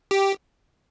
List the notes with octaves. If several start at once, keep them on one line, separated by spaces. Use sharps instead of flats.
G4